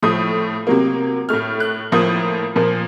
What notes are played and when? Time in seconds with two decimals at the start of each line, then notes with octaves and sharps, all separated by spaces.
0.02 A2 F3 A3 D#6
0.67 C3 F#3 A#3
1.29 A2 A3 F6
1.60 F#6
1.92 A2 F3 A#3 D#6
2.56 A#2 F3 A#3